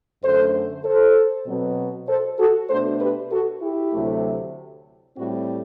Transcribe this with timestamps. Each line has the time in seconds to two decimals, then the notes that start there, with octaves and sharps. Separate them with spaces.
0.23 F#2 D3 A3 A4 C5
0.84 A4 C5
1.47 B2 F#3 C4
2.08 A4 C5
2.39 F#4 A4
2.69 B2 A3 D4 A4 C5
3.01 G4 B4
3.31 F#4 A4
3.62 E4 G4
3.93 D2 C3 F#3 A3
5.16 A2 G3 C4 F#4